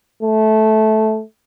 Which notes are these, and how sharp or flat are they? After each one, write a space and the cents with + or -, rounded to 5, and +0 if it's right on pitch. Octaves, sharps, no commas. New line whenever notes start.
A3 -15